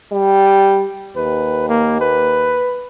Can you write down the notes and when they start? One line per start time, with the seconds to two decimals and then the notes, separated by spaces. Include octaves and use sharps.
0.12 G3
1.16 D#2 B4
1.69 A#3
2.01 B4